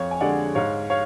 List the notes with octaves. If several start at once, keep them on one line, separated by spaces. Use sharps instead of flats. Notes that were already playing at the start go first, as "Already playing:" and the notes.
Already playing: F2 C#5 F5
G#5
D3 G#3 D5 F#5
G#2 C#5 F5
C#5 F5